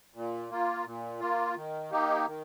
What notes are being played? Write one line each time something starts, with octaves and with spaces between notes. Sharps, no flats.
A#2
A#3 F4
A#2
A#3 F4
D#3
A#3 D#4 G4
D#3